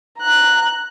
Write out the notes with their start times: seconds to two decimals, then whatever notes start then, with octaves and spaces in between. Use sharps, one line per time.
0.18 A#5 F#6